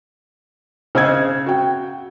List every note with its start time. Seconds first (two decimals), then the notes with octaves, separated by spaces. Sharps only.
0.95 C#3 C5 D#5 E6 G#6
1.46 F#4 G5